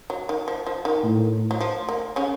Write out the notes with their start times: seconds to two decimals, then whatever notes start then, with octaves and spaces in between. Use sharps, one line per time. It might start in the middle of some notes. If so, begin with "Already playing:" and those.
0.10 F#3
0.29 D#3
0.48 F3
0.67 F3
0.85 D#3
1.04 A2
1.51 F#3
1.61 F3
1.89 A#3
2.16 C#3 C#4